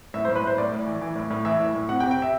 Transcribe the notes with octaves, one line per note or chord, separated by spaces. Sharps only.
A2 E5
C5
A2
B4
A2 C5
A2 D5
A2
E3
E3
A2
A2
E3 E5
A2
A2
C3 F#5
G5
C3
G5
E5